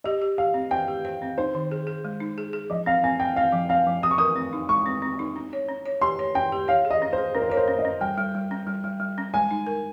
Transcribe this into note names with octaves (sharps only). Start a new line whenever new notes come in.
G4 D#5
G4
G4 F5
C4
C5 G5
G4
C5
C4
D#4 C5
D#3
G#4
G#4
G#3
D#4
G#4
G#4
F3 D#5
C4 F5
C4 G#5
C4 G5
C4 F5
F3
C4 F5
F3
C4 D#6
C#6
A#4 D#6
C4
D#4
G#3 C#6
C4
C4
D#4
C#4
C#5
C#4
C#5
G4 C6
C#5
C#4 G5
G4
C#5 F5
G#4
D#5
C#4
C5
G#4
C#4 A#4
C5
A#4 C#5
C5
C#4
D#5
C#4
G3 G5
G3
G3
C#4
G3
G3
G3
C#4
G#3 G#5
D#4
A#4